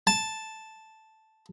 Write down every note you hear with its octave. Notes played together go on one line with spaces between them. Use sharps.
A5